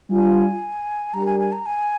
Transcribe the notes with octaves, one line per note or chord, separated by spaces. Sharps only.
G3 D4 F4 G#5
G3 D4 G4 A#4 A#5
G#5
G#5
A#5
G#5